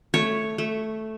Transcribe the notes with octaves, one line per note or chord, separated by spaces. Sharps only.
A3 C#5
A3